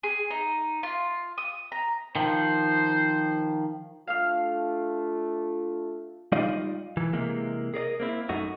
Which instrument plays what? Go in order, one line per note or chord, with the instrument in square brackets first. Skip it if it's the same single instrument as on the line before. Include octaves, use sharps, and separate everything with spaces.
[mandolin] G#4
D#4
F4
D#6
A#5
[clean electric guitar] D#3 F3 [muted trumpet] C5
[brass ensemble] A3 D4 F4 [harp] F5 F6
[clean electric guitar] G3 D#4 F4 D5 D#5 F5
E3
C3 E3 G#3 A#3
G#4 A#4 D5 D#5
A#3 C4 E4
F#2 A3 D#4 F#4